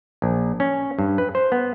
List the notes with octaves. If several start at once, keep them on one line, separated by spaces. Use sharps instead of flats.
A#1
C#4
G2
B4
C5
B3